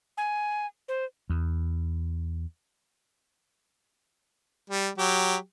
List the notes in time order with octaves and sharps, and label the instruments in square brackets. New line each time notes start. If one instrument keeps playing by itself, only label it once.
[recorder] G#5
C5
[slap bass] E2
[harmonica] G3
F#3 G4